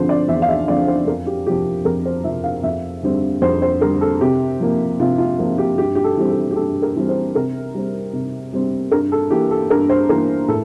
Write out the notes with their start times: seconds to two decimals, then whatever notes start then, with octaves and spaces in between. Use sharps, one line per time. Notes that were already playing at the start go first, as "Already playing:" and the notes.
Already playing: D3 F3 C4 C5
0.09 D5
0.28 E2 E5
0.42 F5
0.49 E5
0.67 D3 F3 C4 D5
0.87 C5
1.06 F2 A#4
1.26 G4
1.46 C3 G4
1.50 F3
1.85 F2 A#4
2.05 C5
2.24 C3 F3 E5
2.44 F5
2.63 F2 E5
3.03 D3 G3 C4
3.42 F2 C5
3.62 C5
3.81 D3 G3 C4 A#4
4.01 A4
4.21 C3 G4
4.60 F3 A#3
5.00 C3 F4
5.18 F4
5.38 F3 A#3 F4
5.58 G4
5.77 G2 G4
5.95 G4
6.04 A4
6.17 E3 G3 C4
6.30 A4
6.51 G4
6.56 G2 A4
6.82 A#4
6.96 E3 G3 C4
7.09 C5
7.35 C3 A#4
7.74 G3 C4
8.13 C3
8.53 G3 C4
8.92 G2 A#4
9.12 A4
9.30 E3 A#3 G4
9.51 A4
9.70 G2 A#4
9.89 C5
10.09 E3 A#3 A#4
10.48 A2 A4